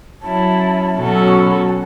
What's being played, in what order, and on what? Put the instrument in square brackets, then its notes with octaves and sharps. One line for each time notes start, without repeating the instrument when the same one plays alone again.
[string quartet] F#3 C#4 E4 [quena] A5
[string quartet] B2 F#3 C#4 F#4 A4
[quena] E6
C#6
B5
A5
F#5